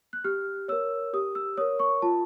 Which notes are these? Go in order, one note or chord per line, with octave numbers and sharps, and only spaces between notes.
F#6
G4 F6
A#4 C#5 E6
G4 D#6
E6
A#4 C#5 D#6
C#6
F4 A5